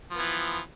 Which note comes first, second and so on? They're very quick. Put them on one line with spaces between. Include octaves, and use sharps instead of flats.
F3 B3 E3